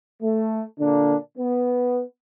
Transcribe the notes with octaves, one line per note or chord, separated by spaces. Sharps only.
A3
A#2 D3 A#3 D4
B3